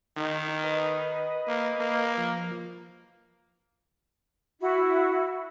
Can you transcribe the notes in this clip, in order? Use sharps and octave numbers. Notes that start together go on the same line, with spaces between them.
D#3 D#4
B4 D#5
A#3
A#3
F3
E4 F#4